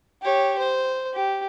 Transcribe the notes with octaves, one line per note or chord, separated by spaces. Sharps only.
G4 C#5
C5
G4